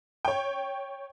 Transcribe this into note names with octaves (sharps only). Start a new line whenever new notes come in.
C#5 G5